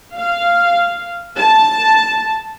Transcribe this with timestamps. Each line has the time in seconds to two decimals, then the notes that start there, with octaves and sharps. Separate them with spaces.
0.16 F5
1.37 A5